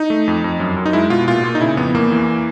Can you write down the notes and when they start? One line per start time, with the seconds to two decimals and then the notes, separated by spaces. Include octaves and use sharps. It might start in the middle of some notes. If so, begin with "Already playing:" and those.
Already playing: D#4
0.10 A3
0.28 F2
0.44 F2
0.60 F#2
0.77 F#2
0.86 D#4
0.93 G#3 E4
1.10 B2 F4
1.28 A#2 F4
1.44 A#2
1.55 D#4
1.61 C#3 E4
1.77 F2 B3
1.94 E2 A#3
2.12 E3